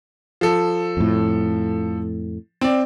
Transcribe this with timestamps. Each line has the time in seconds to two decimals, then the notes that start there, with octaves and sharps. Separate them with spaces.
0.41 F3 A4
0.97 F2 A2
2.61 C4 D5